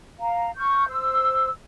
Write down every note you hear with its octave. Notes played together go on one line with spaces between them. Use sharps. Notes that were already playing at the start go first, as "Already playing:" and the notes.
F5 A#5
C#6 F6 G6
C5 E6